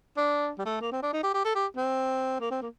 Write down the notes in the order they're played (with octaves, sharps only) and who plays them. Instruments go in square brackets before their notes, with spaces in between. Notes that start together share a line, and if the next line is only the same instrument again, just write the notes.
[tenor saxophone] D4
G3
A3
A#3
C4
D4
D#4
G4
G4
A4
G4
C4
A#3
C4
A#3